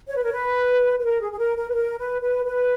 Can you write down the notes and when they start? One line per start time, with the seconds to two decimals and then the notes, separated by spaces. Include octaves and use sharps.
0.09 C#5
0.16 B4
0.23 A#4 C#5
0.32 B4
0.99 B4
1.04 A#4
1.20 G#4
1.32 G#4
1.38 A#4
1.57 A#4
1.69 B4
1.74 A#4
1.98 B4
2.22 B4
2.45 B4